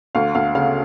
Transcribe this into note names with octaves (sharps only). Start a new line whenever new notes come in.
D2 F5
D2 F5
C#3 F5